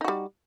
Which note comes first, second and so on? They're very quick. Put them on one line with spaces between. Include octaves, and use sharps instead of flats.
D#4 F#4 G3